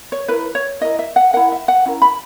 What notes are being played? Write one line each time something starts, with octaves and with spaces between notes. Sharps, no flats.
C#5
E4 A#4 B4
C#5
E4 A#4 D#5
E5
F#5
E4 A#4 F#5
E5
F#5
C#4 E4 A#4
B5